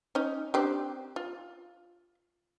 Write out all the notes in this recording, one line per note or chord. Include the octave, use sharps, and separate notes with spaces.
C#4 D#4
C4 D4 G4
F4